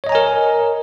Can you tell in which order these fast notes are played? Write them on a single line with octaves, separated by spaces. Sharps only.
C#5 D#5 A#5 G#5 A#4